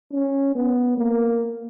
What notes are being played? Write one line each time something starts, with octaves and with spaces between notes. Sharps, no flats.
C#4
B3
A#3